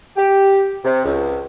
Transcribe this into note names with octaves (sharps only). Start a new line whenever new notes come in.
G4
C3
C#2